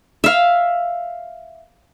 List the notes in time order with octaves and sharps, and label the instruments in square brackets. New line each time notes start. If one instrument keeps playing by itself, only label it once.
[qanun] E5 F5